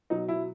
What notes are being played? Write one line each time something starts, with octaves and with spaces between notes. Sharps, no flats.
B2 F#3 D#4
E4